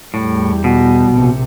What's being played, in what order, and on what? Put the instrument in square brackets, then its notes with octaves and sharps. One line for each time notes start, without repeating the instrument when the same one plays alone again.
[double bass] E2 G3 [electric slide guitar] A2
[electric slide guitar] B2
[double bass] A#1 C3